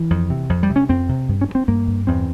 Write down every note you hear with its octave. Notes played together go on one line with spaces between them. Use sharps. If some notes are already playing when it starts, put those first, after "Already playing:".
Already playing: E3
F2
C3
F2
G3
C3
C#4
F2 C4
C3
G2
C#4
G2
C4
G2 A#3
G2
E2 C4